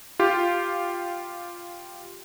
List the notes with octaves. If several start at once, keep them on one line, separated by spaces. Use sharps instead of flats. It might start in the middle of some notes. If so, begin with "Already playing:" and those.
F4 G4